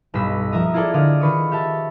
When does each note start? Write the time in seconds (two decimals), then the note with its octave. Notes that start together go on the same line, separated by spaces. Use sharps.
0.14 B1 G2 G3 D#5 E6 B6
0.52 F3 E5 A#5 D#6
0.74 E4 F4 G#4 A4 D5
0.93 D3 D5 D#5 F5
1.20 D#3 B4 C#6 D#6
1.52 G4 E5 A5